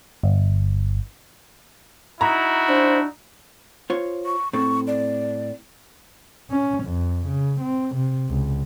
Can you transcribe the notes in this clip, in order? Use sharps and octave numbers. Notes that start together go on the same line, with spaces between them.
G1
D#4 E4 F#4 A#5
D4 C5
F4 C5 C#5
C#6
A2 C4 A4 C#6
D5
C#4
F2
C#3
C4
C3
C#2